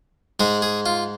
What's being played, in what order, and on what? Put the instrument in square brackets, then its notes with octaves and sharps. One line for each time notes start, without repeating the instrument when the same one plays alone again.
[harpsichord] G#2 G#3 G#4
G#4
F4